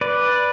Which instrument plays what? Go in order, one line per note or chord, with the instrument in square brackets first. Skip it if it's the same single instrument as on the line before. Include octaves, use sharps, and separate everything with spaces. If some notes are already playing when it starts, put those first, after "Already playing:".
[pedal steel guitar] B4 D5